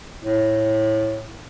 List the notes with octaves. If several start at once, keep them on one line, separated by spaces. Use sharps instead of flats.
A2